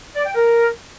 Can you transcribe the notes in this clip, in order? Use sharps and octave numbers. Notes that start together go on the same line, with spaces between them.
D5
G5
A#4